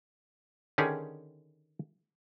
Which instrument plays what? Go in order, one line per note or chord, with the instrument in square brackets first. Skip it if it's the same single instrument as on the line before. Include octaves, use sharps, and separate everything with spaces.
[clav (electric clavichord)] D3 D#3 C#4 G4 G#4